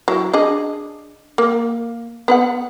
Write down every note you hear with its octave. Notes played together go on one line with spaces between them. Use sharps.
F#3 E4
D4 G#4 D#5
A#3
B3 B4 F#5